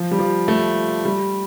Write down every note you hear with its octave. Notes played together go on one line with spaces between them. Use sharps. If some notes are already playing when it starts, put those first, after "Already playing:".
Already playing: F3
G3
F3
A3
G3